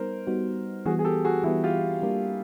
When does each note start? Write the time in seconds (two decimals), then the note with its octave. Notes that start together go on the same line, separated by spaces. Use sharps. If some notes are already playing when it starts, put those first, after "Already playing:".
Already playing: G3 B3 D#4 A#4 C5
0.27 G3 B3 D#4 F#4
0.86 E3 G3 B3 F#4 G#4
0.99 G#4
1.05 G4 A4
1.25 F#4 G#4
1.44 E3 G3 B3 E4 F#4
1.64 F4 G4
2.03 G3 A#3 D4 G4 A#4